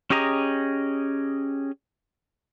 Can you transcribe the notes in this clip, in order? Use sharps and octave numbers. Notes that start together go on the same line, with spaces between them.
C#4 G4 G#4 D#5 A#5